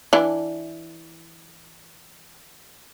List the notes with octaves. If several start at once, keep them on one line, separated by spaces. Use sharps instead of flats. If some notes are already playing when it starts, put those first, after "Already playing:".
E3 D4